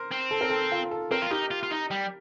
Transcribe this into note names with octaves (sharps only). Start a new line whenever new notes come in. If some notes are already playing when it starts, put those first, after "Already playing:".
Already playing: A#4 C5
C4
A4
A#4
A4
F4
A4
C4 A#4
F4
D#4 G4
F4
F4
D#4
G3